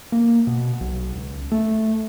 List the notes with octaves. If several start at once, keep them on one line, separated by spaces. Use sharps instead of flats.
A#3
B2
B1
C#2
A3